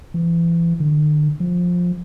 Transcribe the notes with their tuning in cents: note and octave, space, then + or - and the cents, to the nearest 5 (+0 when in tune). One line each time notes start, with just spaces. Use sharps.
E3 +35
D3 +45
F3 +15